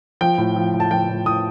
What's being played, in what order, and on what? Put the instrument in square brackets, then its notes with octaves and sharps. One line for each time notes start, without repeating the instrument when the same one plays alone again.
[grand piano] F3 G5
A2
F3
A2
A5
F3 G5
A2
A2 D#6